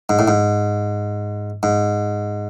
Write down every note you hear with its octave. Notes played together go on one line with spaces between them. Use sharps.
G#2
A2
G#2
G#2